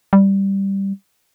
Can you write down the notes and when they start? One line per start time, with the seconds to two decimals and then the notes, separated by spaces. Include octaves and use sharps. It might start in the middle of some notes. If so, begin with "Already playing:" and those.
0.13 G3